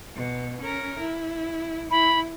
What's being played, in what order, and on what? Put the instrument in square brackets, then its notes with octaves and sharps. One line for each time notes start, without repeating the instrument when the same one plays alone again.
[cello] B2
C#4 A#4
E4
[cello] E4 [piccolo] B5